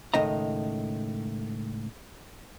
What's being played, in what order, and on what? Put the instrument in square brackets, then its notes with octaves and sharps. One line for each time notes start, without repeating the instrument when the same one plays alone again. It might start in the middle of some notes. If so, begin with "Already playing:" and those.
[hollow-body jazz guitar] C#2 A2 D#3 D#5 A#5